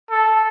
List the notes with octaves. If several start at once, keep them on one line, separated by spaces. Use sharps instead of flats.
A4